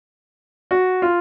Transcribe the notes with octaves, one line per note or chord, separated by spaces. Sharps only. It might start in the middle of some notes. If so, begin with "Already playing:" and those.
F#4
F4